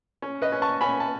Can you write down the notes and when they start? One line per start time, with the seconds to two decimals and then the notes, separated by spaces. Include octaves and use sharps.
0.22 C#4
0.42 B4 D#5
0.52 C#4
0.62 A5 C#6
0.81 C#4 G#5 B5
1.00 A5